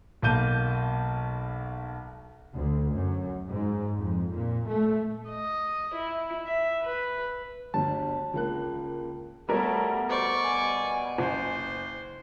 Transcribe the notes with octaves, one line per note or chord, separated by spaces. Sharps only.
B1 A#3 A5 G6 D#7
D2
F#2
G#2
F2
A#2
A3
D#5
E4
E5
B4
G1 D2 A5
C#2 A#3 F#6
G3 A3 B3 F#4 A#4 C#5
B2 C5 D5 C#6
G#5
F#1 C5